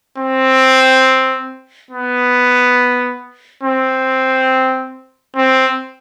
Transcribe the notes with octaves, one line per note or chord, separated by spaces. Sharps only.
C4
B3
C4
C4